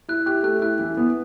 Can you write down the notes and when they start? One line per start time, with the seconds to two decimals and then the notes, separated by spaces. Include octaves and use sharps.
0.09 E4 F#6
0.26 G4 F#6
0.43 A3 F#6
0.62 E4 F#6
0.79 E3
0.97 B3